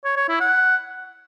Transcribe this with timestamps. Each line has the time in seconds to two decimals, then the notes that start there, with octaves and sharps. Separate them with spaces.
0.05 C#5
0.17 C#5
0.29 E4
0.40 F#5